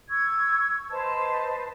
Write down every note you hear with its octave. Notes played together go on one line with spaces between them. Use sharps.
C#6 E6 G#6
B4 C5 D#5 A5